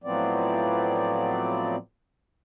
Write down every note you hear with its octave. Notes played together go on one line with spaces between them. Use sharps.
A2 F3 F#3 B3 C4 D5